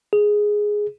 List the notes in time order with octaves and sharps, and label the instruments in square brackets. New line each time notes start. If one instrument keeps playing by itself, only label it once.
[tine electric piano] G#4